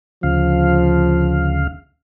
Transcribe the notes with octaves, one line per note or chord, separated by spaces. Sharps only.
D2 C#3 F3 F5